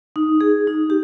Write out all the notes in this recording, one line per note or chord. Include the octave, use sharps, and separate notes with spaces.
D#4
G#4
D#4
G4